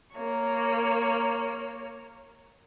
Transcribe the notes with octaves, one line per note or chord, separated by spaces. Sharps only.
A#3 C#5